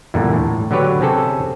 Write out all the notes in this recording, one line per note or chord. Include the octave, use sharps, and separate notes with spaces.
E2 G2 A#2 D3
A2
D3 F#3 G4 B4 C#5
C3 C4 C#4 G#4 A4